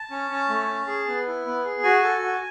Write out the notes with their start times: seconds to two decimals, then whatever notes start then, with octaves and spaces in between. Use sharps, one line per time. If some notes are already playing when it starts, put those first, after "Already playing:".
Already playing: A5
0.11 C#4
0.30 C#4
0.49 A3
0.68 C#4
0.87 G#4
1.07 B3
1.27 E4
1.46 B3
1.65 G#4
1.83 F#4 G#5
2.03 A4
2.23 F#4